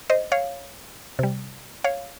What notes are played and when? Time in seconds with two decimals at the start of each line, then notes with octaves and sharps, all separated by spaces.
0.10 C5 D#5
0.32 C#5 F5
1.19 C3 G3
1.84 C#5 F5